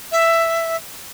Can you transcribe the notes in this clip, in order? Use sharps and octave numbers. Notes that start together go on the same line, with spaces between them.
E5